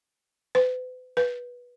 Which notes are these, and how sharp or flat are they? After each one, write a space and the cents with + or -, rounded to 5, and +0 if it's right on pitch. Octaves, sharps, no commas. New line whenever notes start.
B4 +40
B4 -15